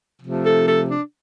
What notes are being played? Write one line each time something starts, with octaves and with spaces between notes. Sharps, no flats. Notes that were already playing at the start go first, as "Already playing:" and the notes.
C3 F3 A3
A4
A4
D4